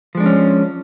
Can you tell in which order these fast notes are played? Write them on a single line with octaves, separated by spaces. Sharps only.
F3 G#3 D4 A#3 C#4